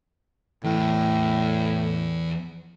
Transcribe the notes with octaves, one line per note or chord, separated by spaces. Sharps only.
E2 A2